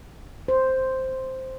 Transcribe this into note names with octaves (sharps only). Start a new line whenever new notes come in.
C5